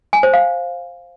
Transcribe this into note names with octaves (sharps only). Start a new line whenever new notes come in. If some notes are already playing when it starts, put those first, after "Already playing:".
G#5
C5
F5